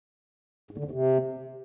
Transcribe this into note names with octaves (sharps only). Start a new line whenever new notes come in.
G#2
D3
F2
C3